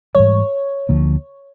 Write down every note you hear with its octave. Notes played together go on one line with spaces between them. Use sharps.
G#2 E3 G3 C#5
D2 D3 F3 A#3